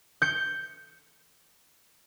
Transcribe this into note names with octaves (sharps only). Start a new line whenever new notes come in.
G6 C#7